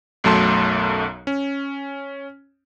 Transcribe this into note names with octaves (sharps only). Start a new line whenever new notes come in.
B1 F#2 F#3 A3 A5 C6
C#4